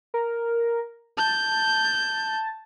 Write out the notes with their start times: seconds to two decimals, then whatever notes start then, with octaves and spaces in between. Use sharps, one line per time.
0.14 A#4
1.18 A5 G6